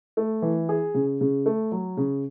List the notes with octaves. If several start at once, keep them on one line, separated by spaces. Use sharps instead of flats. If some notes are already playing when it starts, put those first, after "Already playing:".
A3
E3
G#4
C#3
C#3
A3
F#3
C#3